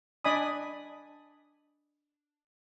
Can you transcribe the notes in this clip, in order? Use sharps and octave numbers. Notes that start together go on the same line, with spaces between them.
D4 D5 D#5 G#5 B5 D#6